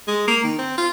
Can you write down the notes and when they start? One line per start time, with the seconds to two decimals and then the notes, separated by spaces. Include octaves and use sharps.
0.08 G#3
0.28 A#3
0.43 D#3
0.58 C4
0.78 F4